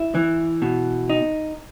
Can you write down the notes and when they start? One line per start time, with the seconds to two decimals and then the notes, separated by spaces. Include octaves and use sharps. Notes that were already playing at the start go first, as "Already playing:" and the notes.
Already playing: E4
0.15 E3
0.62 B2
1.10 D#4